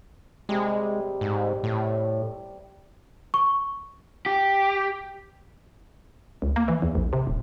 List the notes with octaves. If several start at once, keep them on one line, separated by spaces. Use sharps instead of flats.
C3 G3 G#3
G#2
A2
C#6
G4
C#2
A#3
E3
E2
A#1
C3
D1